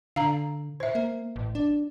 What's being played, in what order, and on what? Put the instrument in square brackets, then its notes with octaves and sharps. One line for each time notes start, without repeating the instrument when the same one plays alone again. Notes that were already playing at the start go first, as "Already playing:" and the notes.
[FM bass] D3 [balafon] F5 A#5
[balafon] C5 E5
[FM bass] A#3
A1
D4